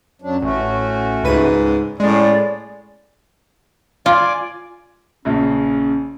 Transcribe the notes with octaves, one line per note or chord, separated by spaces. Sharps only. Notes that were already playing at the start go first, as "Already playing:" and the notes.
F#2 F#3 D4
A1 A3 C#4 F#4
C#2 G#2 B4 D#7
A2 G#3 C#4 G#4 D5
F4 D5 G#5 D6
A#1 C#3 C#4